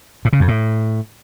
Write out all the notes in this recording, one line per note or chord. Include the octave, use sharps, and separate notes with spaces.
A2
C#3
F2
A2